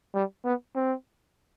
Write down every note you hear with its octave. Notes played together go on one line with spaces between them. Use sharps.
G3
B3
C4